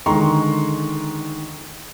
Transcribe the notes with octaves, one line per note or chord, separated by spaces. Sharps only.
D3 D#3 G#3 A#5 C6 C#6